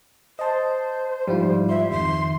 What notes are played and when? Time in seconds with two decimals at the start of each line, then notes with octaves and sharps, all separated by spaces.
0.39 C5 D#5 A5
1.27 G#2 F3 G3 E4 F4
1.69 E5 C6
1.91 F2 D#3 C6